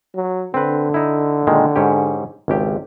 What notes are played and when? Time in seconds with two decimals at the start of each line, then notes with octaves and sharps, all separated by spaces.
0.15 F#3
0.54 D3 C4 B4
0.94 D#4 E4
1.47 A#2 D#3 G#3
1.76 G#2 C#4 G4
2.48 G#1 C#2 G4